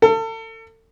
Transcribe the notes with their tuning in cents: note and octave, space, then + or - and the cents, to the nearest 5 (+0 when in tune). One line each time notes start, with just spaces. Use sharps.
A4 +35